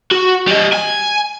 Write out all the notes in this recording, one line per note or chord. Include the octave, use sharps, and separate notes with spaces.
F#4
G3 D#5
G#5